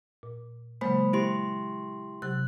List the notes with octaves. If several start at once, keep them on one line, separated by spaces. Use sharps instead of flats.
A#2
C#3 F#3 G#3 A#3 C5 B5
E4 G4 C6
C3 F#3 G4 F#6